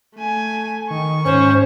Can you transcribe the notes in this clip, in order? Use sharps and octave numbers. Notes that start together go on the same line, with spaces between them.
A3 G#5
D#3 C#6
G#2 C#4 C5